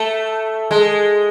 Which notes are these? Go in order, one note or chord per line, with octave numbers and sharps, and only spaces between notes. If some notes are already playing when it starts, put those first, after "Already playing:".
Already playing: A3
G#3